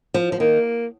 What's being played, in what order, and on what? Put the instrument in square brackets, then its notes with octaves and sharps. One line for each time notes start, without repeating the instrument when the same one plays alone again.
[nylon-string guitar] F3
F3
[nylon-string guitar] D#3 [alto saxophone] A#3